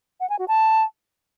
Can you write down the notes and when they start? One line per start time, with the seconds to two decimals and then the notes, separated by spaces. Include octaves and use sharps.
0.20 F#5
0.30 G#5
0.39 F#4
0.48 A5